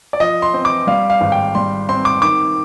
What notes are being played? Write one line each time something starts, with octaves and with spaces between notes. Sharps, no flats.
D5
F3 D#5
C6
C4
D6
G3 F5
F5
G#1
G5
G3 C6
C4 C6
D6
D#3 D6